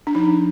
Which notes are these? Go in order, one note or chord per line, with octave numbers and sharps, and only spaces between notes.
D4
F3 D#4